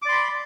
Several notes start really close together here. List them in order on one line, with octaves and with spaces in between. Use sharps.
D6 D5 C6 B5